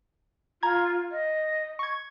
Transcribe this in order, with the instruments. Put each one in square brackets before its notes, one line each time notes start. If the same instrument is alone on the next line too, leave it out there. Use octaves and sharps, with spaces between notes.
[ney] F4 [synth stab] A#5 G#6
[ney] D#5
[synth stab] C#6 G#6